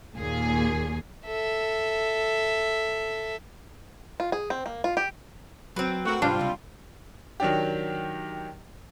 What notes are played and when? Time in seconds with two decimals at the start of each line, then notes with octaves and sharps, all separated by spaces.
0.16 D#2 A#2 G#4
1.26 A4 E5
4.20 F4
4.32 G#4
4.50 C4
4.66 A#3
4.84 F4
4.97 G4
5.76 F#3 C4 B4
6.05 A3 F#4 A#4
6.22 C2 G#2 G3 D4 F4 C#5
6.39 C#2 C3
7.40 D#3 F#3 D4 G4